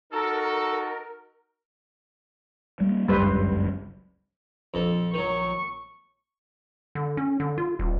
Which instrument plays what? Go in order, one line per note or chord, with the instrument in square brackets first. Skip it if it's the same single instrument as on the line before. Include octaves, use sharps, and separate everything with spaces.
[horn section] D#4 F#4 [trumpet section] A4 [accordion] A#4
[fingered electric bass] G3 A#3
[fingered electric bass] G1 C#2 F#2 [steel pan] G3 B4 C5
[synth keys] A#1 F3 [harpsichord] F2 A4
[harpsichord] D#3 F#3 [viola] C#6
[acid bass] D3
C#4
D3
F4
D#1